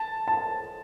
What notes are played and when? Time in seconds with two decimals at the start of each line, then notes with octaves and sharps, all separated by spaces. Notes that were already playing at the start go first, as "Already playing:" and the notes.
Already playing: A5
0.28 A5